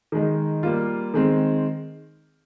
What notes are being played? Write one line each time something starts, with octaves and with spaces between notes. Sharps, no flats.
D#3 G#3 D#4
G3 A#3 F4
D#3 G#3 C4